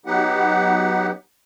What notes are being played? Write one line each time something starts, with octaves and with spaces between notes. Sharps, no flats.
F#3 B3 D#4 G4 F#5